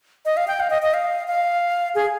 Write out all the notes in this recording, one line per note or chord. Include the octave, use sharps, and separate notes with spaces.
D#5
F5
G5
F5
D#5
D#5
F5
F5
G#4